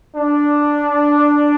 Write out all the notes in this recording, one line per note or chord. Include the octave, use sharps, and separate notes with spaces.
D4